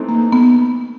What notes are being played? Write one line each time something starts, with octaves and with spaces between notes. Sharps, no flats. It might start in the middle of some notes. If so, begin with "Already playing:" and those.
Already playing: E3 A3 C4 D#4
A#3
B3